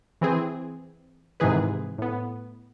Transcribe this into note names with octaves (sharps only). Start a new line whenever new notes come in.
E3 C4 G#4
G#2 C3 D#3 E3 G#4 B4
A2 B3